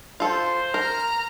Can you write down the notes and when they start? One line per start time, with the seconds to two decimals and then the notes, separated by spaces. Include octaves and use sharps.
0.20 F4 A4 C5
0.74 A#4 A#5 F6